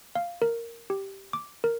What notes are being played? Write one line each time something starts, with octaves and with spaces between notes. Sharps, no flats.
F5
A#4
G4
D6
A#4